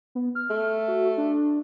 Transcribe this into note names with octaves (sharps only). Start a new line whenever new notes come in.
B3
F6
A3
F#4
D4